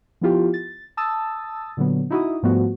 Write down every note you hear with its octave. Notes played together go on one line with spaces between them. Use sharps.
F3 B3 E4 F4 G4
A6
A5 D#6 E6 A6
A#2 D3 F#3 B3
D#4 E4 F#4 D#6
G#2 F3 G3 A3 B3 F#4